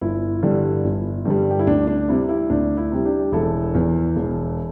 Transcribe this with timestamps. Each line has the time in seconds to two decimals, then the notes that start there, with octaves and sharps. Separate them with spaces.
0.01 G1 E4
0.43 G2 D3 G3
0.84 G1
1.25 G2 D3 G3
1.51 G4
1.59 E4
1.67 D2 D4
1.87 D4
2.08 C3 G3 E4
2.29 E4
2.50 D2 D4
2.77 E4
2.92 C3 G3
3.05 D4 G4
3.32 E1 E4 A4
3.74 E2 E3
4.16 E1